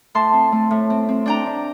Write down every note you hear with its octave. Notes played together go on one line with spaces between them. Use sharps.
A2 A5 C6
C4
A3
A2
C4
C4
D4 G5 A#5
D4